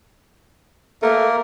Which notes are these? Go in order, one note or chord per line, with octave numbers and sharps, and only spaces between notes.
A3 A#3 A#4